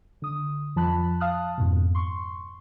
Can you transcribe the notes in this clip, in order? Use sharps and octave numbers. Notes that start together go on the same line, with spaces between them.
D3 D#6
F2 F3 A5 B5 F#6
F5 A5 D#6 F6 F#6
F2 G#2 B2
C6 C#6